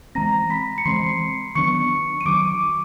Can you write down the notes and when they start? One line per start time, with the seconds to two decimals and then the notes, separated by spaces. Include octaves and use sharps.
0.15 E3 G#3 C4 A#5 A#6
0.50 B5 B6
0.78 C#7
0.85 E3 G#3 C4 C6 C7
1.55 D#3 F#3 B3 D4 C#6 C#7
2.21 D#7
2.25 D#3 F#3 B3 D4 D6 D7